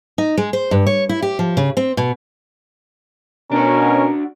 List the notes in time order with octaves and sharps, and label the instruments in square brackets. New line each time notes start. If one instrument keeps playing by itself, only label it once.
[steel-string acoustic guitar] D#4
G#3
C5
G2
C#5
E4
G4
F3
C#3
C4
B2
[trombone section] B2 C#4 [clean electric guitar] D4 F#4 [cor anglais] A#4